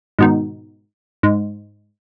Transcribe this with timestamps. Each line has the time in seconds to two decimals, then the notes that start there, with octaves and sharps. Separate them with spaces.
0.19 G#2 B2 D#3
1.23 G#2